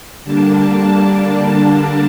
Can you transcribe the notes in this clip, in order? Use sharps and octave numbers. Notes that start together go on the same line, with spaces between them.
D3 G3 A#3 D4 A5